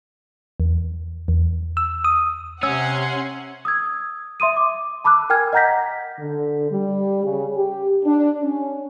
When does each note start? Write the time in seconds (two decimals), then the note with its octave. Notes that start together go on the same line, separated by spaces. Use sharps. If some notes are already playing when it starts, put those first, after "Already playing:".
0.60 E2
1.28 E2
1.77 E6
2.04 D#6
2.63 C3 C#4 F#5 C6 E6
3.65 D#6 E6 G#6
4.40 E5 C6 D#6 D#7
4.56 D6
5.04 A5 B5 D6 E6 F#6
5.30 A#4 G5 G#5 F6 G#6
5.53 D#5 F#5 A#5 G6 A#6 B6
6.19 D3
6.71 G3
7.24 C#3
7.56 G4
8.05 D4
8.43 C#4